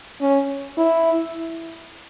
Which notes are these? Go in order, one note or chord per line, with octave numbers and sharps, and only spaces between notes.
C#4
E4